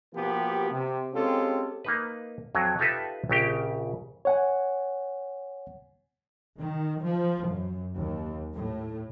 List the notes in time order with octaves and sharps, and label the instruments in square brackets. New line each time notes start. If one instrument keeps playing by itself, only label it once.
[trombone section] B2 F3 A#3 B3 G4
C3
G#3 C4 C#4 F4 G4 A4
[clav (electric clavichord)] A#3 D#4 B4
F2 F#3
D#4 F4 G4 A4 B4 E5
A#1 C#3 G4 G5
[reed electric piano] C#5 F#5 G#5
[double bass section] D#3
F3
F#2
D#2
A2